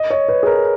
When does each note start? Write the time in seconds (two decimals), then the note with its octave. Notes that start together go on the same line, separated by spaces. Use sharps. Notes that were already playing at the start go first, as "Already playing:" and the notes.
Already playing: D#5
0.10 C#5
0.29 B4
0.43 G#4
0.46 A#4